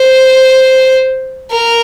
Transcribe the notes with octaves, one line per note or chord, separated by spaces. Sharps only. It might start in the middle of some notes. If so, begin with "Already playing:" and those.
Already playing: C5
A#4